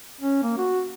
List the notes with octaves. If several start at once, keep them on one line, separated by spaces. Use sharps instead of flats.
C#4
A#3
F#4